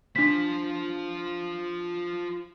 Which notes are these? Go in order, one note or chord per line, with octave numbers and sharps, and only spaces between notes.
D4 F4 C5 B6